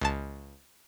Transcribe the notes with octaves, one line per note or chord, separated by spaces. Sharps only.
C#2 A5